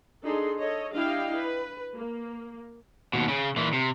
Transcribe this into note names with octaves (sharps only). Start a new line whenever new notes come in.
D4 D#4 G#4 A4 C6
A4 C#5 D#5
D4 E4 G4 D#5 F5 G5
B4
A#3
D#2 B2
C#3
A#2 E3
C3